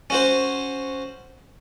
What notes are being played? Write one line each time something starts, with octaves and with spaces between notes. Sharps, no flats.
C#4 F#4 C5